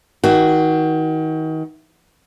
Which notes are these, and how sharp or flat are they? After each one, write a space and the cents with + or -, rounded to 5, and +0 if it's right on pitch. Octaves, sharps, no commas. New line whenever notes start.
D#3 +35 F#4 +20